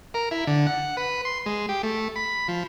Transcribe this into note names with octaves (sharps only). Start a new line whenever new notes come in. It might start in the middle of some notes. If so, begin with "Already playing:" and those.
A#4
E4
D3
F#5
B4
C6
G#3
G4
A3
B5
F3